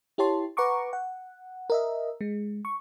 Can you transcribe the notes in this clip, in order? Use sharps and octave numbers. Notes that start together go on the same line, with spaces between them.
E4 G4 C#5 A5 C6
B4 F#5 A#5 C#6 D6
F#5
A#4 D#5 E5
G#3
C#6